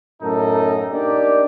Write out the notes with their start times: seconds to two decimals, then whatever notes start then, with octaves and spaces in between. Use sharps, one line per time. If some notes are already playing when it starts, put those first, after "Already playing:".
0.22 F#2 A2 C#4 D#4 A4
0.92 A#3 D4 D#4 G4 D5